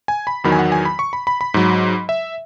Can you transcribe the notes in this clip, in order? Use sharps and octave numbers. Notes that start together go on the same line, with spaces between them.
G#5
B5
E2 D#3 F#3 B5
G#5
F#5
G#5
B5
C#6
B5
B5
B5
G#2 F#3
E5